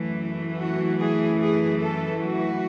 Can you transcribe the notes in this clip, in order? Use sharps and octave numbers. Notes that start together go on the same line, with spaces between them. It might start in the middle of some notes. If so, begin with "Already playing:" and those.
Already playing: F#2 E3 A3
F#4
G#4
G#4
A4
F#4